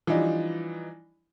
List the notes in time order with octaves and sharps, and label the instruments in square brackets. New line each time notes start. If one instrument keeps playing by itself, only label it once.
[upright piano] E3 F3 G3 D4 D#4